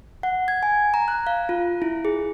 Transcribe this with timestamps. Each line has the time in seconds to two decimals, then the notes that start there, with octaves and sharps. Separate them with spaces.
0.23 F#5
0.48 G#6
0.63 G#5
0.94 A#5
1.08 F#6
1.27 F5
1.49 F4
1.82 E4
2.05 G#4